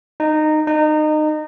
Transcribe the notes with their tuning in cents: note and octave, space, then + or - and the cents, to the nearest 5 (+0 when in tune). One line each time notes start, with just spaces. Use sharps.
D#4 -15
D#4 -25